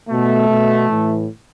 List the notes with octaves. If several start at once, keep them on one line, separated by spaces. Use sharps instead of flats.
B2 A3
B2
A2 E3